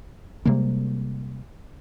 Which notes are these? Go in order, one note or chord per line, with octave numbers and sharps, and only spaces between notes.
C3 G3 G#3 A#3